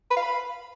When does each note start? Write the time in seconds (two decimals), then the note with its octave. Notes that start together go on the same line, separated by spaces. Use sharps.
0.11 B4
0.17 F5
0.22 B5